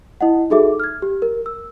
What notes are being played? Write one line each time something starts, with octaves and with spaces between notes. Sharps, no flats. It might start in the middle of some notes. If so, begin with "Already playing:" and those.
E4 D#5 F#5
D#4 F#4 G#4 A4 E5 D6
F6 G#6
G4
A#4
E6